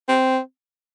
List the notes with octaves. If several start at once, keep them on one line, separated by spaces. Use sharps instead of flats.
C4